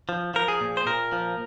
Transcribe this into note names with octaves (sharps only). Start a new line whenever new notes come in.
F3
F3 A#4
G#4
A#2
C5
A#2 A#4
F3